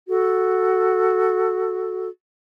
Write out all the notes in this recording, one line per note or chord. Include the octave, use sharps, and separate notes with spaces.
F#4 A4